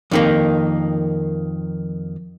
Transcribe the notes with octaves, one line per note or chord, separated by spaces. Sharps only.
F2 D#3 A#3